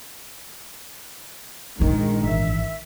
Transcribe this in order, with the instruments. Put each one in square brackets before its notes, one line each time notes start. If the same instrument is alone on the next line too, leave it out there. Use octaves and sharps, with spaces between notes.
[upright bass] A#1 D4 [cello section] G#2 D#3 G#3
[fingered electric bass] G#1 E3 [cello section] E5